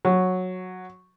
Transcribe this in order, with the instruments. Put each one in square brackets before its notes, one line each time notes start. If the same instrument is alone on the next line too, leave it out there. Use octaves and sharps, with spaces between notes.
[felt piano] F#3